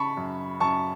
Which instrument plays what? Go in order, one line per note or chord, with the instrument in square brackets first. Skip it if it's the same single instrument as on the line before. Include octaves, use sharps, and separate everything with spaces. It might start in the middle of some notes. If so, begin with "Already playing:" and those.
Already playing: [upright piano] C#3 A5 B5 C#6
F#2
F#2 A5 C#6